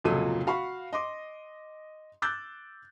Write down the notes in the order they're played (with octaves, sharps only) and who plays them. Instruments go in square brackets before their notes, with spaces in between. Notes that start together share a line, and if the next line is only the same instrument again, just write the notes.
[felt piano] F1 C#2 A#2 F#3 A4 D#7
F#4 F5 B5 C#6
D#5 C6 D6
D6 E6 F#6 G6 A6